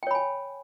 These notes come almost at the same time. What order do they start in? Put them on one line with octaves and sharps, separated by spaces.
G5 C#5 B5 G#5